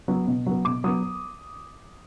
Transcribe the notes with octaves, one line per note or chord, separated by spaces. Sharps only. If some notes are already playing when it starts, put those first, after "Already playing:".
F#3 B3
B2
F#3 B3
B2 D6
F#3 B3 D#6